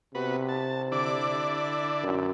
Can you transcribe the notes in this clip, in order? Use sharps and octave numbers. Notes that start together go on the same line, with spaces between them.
C3 B3 F#4 B4
A5
D3 E4 D5 D6
F#2